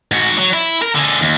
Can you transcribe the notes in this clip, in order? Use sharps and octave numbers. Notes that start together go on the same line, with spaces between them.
G#2 F#4
F#3
E4
A#4
D3 G#4
D#2